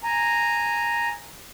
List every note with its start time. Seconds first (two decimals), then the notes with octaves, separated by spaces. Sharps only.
0.03 G#5 A#5